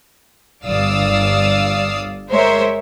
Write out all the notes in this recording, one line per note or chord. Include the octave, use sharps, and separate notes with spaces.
G1 D5 F5 D#6 E6
G#3 A#4 C5 C#5 E5